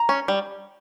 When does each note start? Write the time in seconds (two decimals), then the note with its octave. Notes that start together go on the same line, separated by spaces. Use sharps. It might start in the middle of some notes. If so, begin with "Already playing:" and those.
Already playing: A#5
0.09 C#4
0.28 G3